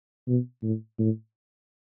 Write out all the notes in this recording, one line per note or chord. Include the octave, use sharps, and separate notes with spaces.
B2
A2
A2